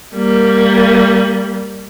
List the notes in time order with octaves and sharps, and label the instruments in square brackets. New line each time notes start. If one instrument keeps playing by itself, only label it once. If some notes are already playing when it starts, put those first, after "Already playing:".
[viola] G3 A#3